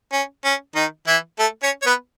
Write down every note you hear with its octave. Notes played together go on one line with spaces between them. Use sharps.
C#4
C#4
D#3 D#4
E3 E4
A3 A4
C#4 C#5
C#5
B3 B4